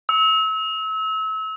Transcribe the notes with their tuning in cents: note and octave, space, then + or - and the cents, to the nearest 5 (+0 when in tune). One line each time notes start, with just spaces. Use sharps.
E6 -35